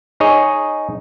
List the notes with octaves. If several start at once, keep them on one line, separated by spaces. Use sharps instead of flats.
D#4 G#4 C#5 D#5